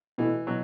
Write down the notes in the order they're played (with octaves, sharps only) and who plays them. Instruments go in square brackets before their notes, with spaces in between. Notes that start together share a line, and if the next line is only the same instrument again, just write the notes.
[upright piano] B2 A3 E4 [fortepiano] E3
[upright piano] B2 [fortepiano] F#3